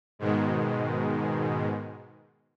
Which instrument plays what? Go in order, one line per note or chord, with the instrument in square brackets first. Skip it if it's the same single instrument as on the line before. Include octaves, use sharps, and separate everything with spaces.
[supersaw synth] G#2 B2 D#3 G#3